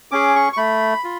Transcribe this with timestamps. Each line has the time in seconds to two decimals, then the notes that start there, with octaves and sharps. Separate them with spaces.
0.11 C#4 G#4 D6
0.35 C#6
0.53 C#6
0.57 A3 B5
1.04 F4